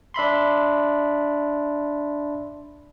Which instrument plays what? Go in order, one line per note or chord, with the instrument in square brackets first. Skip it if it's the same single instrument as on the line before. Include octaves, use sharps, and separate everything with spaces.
[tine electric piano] D4 E5 B5 C6